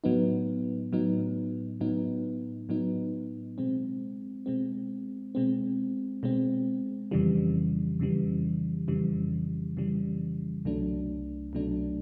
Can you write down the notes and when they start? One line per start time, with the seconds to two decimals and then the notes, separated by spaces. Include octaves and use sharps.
0.04 A2 F#3 B3 D#4
0.92 A2 F#3 B3 D#4
1.81 A2 F#3 B3 D#4
2.69 A2 F#3 B3 D#4
3.58 B2 G#3 C4
4.46 B2 G#3 C4
5.35 B2 G#3 C4
6.23 B2 G#3 C4
7.11 F2 C#3 E3 G3
8.00 F2 C#3 E3 G3
8.88 F2 C#3 E3 G3
9.77 F2 C#3 E3 G3
10.65 C2 B2 F#3 A3 D4
11.53 C2 B2 F#3 A3 D4